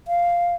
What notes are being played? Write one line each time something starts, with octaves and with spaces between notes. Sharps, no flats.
F5